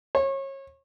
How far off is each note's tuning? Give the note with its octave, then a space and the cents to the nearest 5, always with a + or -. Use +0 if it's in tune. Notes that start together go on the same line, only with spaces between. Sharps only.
C#5 -30